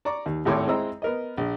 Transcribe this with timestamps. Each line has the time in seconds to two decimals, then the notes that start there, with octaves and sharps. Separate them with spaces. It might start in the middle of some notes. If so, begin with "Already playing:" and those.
0.05 D5 A#5 C#6 D6
0.26 D#2
0.45 G#1 D#2 A2 C#5 C6 D6
0.67 G#3 C4 E4 D#5 A#5 E6
1.02 B3 A#4 D#5
1.37 A#1